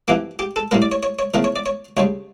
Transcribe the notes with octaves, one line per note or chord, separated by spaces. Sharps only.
F2 E3 A#3 G4
G4
A4
A2 G3 A#3 A#4
D5
C#5
C#5
C#5
E2 C#3 F3 A3 A#4
C#5
D5
C#5
D2 C#3 G3 C#5